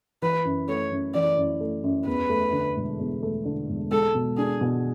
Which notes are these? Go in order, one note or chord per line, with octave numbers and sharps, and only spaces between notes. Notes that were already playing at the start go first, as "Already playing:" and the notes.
E3 B4
F#2
A3 C#5
F#2
E3 D5
F#2
A3
F#2
E2 B4
A3
D3
E1
E2
A3
D3
E1
G#3 A4
B2
D4 G#4
B2